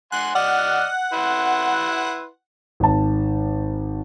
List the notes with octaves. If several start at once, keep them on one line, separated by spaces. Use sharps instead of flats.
F#5 G#5 C6 F#6
D5 D#5 F#5 F6
E4 B4 C6
G#1 A5